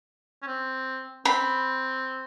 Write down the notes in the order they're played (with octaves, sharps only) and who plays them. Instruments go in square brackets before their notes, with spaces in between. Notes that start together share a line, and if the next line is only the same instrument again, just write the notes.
[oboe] C#4
C4
[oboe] C4 [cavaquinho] B5